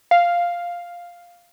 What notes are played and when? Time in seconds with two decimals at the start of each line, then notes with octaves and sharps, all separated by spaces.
0.11 F5